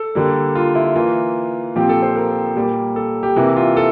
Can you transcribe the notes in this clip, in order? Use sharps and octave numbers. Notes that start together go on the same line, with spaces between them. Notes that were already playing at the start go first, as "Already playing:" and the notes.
Already playing: A4
D3 G3 A#3
F4
E4
E3 A#3 F4
A#2 F3 C4 G4
A4
C5
A#4
A#2 G3 A#3
A4
G4
C3 E3 A#3 E4
F4
A4